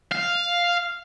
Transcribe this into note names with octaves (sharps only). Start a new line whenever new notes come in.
F5